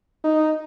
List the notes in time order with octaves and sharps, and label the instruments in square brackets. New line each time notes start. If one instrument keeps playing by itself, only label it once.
[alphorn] D#4